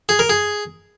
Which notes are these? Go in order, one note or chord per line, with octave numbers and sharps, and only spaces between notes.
G#4
A#4
G#4